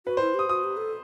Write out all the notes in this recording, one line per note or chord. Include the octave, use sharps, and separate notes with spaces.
F#4 B4
E4 C5
G4 D#6
F#4 D#6
G4
A4